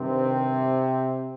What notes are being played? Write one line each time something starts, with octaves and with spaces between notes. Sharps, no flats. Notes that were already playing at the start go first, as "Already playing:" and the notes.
Already playing: G2 C3 D#3 C4